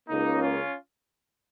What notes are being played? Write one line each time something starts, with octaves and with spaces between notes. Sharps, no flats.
C#2 C#3 A#3 D#4
C#4 F4